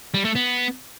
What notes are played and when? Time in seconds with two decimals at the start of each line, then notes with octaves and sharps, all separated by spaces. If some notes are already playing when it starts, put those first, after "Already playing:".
0.14 G3
0.25 A3
0.35 B3